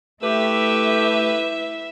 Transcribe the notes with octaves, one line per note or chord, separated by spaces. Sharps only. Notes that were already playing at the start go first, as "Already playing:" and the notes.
A3 E4 G4 B4 E5